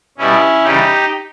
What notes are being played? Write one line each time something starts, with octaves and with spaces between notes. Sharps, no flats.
B2 G3 C#4 E4
C#3 E3 G3 D#4 G4